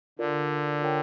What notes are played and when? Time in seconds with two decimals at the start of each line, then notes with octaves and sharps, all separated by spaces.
0.19 D3 F4 A#4 D5
0.82 F4 A#4 C#5 G5